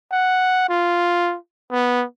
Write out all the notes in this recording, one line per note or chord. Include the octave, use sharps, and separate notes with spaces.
F#5
F4
B3